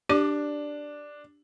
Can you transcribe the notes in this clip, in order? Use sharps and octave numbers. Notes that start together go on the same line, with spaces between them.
D4 G4 D5 D6